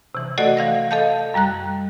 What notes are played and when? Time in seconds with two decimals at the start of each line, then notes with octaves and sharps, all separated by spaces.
0.15 C3 E3
0.38 A3 F#4 A4 D5 D#5 F#5
0.57 E3 F5 A#6
0.91 A4 D#5 F5 A5 G6
1.34 F#2 G3 A#5 F#6